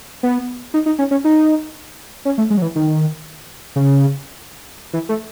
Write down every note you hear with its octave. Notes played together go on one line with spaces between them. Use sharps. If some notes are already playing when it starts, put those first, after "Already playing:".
B3
D#4
D#4
C#4
C#4
D#4
C#4
A3
G#3
F#3
E3
D#3
C#3
E3
A3